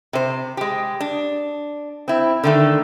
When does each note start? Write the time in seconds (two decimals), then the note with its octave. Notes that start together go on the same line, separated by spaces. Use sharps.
0.13 C3 C5
0.57 G#3 G4
1.00 D4
2.08 C4 E4
2.44 D3 D#3 A3